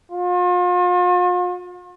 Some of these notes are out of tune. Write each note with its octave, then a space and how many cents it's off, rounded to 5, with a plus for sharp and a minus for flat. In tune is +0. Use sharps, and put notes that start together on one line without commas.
F4 +40